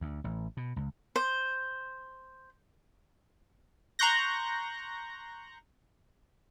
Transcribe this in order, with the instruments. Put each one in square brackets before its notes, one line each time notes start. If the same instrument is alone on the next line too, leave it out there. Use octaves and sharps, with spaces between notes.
[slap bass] D2
A1
B2
C#2
[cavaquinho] C5
[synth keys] A#5 C6 C#6 F#6 G6 A#6